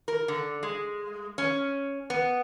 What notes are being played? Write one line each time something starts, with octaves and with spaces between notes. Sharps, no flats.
A#4
D3
G#3
C#4
B3